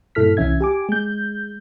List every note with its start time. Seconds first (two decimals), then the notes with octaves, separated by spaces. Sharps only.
0.15 G2 A#2 E4 A4 F6 B6
0.37 C2 E3 C#4 E5 G#6
0.61 G4 G#5 D6
0.89 G#3 G6